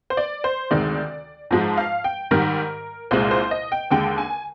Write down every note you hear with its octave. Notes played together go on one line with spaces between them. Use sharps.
C5
D5
C5
D2 C3 D#3 G#3 D5
G#2 F3 G#3
F5
G5
G#2 D#3 G3 A#4
C2 A#2 G#3 C5
C5
D#5
G5
D#2 D3 G#3 G5
G#5